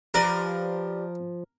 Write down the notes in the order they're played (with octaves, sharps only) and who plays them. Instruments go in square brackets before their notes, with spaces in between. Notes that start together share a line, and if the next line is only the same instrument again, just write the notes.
[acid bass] F3 [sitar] G4 B4 D5 [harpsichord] A#4